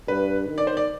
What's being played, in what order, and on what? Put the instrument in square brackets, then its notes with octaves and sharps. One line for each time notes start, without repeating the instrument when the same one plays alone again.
[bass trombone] G2 [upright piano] B4
[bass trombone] D#3
[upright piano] D5
C5
D5